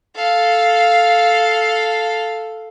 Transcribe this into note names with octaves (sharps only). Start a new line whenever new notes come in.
A4 F5